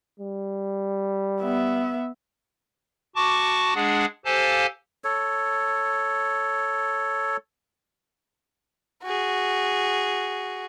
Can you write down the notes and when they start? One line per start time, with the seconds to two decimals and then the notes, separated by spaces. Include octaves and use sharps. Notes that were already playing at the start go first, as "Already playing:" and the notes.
0.20 G3
1.41 B3 E5
3.16 F#4 A5 C#6 D6
3.75 G#3 D4 G#4 F#5
4.25 G4 A4 C5 F5 G#5 A5
5.04 A4 C#5
9.04 F#4 G#4